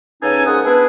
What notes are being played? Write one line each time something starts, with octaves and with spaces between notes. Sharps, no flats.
C#3 B3 C#4 D#4 A4 G#5
G#2 A#3 C#4 C5 F#5 D#6
B3 D4 E4 G#4